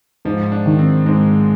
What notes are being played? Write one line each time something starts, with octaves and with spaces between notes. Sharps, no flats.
G#2 F3
D4
D#3
C4
G#2 G#3